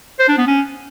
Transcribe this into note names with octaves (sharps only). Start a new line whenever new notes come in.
C5
D4
B3
C#4